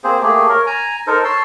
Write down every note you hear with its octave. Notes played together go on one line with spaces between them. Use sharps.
A#3 C4 G#4 C5
A3 A#3 G4 G#4
A#4 C#5
G#5 A#5
D#4 A4 A#4 C5
C#5 A5 C6 E6